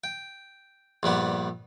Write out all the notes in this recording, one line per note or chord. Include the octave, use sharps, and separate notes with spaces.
G5
A#1 G2 G3 B3